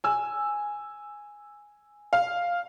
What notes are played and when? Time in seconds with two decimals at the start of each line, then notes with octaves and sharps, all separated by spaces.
0.04 G#5 E6
2.13 F5